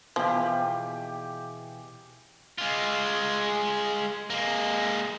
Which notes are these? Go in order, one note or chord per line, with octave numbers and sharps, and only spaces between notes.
B2 E3 F3 G4 G#4 F5
G#3 F4
G#3 A#3